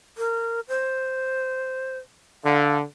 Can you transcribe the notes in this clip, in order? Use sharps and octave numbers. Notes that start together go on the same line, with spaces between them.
A#4
C5
D3 F5